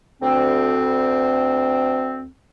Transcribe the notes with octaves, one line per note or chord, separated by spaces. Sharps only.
D2 C4